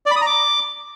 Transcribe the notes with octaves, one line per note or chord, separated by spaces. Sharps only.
D5
B5
D#6
A#5
D6